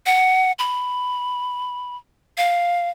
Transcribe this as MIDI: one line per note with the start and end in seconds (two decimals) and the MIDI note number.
0.06 0.52 78
0.59 1.96 83
2.37 2.90 77